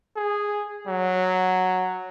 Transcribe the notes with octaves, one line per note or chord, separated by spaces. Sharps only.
G#4
F#3